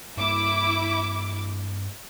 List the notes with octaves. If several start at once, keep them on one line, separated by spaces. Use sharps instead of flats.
G2 A#3 E4 D6